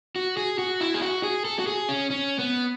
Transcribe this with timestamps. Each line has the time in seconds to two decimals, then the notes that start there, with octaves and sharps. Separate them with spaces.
0.16 F#4
0.37 G#4
0.59 F#4
0.81 E4
0.94 G#4
1.02 F#4
1.23 G#4
1.45 A4
1.59 F#4
1.67 G#4
1.89 C#4
2.10 C#4
2.39 B3